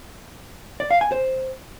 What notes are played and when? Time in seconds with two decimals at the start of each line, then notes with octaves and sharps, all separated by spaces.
0.80 D5
0.91 F5
1.01 G#5
1.12 C5